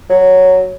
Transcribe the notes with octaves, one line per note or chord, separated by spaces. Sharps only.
F#3